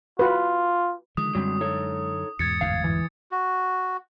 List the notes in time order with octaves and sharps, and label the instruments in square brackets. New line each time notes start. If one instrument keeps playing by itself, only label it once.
[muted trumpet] F4 [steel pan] F#4 B4
[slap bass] D3 D#3 F3 [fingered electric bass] G#3 [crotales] D#6
[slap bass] F#2 D3 [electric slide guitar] F#3 G3 C4
[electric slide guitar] D#4 A4 C#5
[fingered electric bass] E2 G#2 [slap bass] B2 [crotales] G#6 A6 C#7
[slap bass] G1 F#2 A2 [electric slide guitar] F5
[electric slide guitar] E3
[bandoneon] F#4